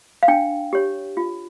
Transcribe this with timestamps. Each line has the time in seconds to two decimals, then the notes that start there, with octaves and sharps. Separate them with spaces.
0.23 F5
0.28 D4 G5
0.73 G4 C#5
1.17 F4